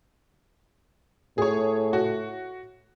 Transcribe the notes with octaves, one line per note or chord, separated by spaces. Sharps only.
A2 G#4 C#5
F#4